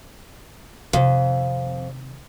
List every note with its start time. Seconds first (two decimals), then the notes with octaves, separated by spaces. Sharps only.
0.93 F2 C3 D#3